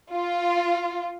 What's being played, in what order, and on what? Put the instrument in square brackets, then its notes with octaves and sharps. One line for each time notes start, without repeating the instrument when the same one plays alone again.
[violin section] F4